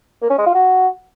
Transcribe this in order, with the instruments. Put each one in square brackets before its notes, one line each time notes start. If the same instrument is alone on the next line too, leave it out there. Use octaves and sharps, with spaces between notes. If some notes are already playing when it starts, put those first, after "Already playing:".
[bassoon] A#3
C#4
G#3
F4
F#4